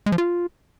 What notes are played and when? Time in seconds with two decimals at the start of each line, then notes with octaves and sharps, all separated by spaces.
0.06 G#3
0.12 F3
0.18 F4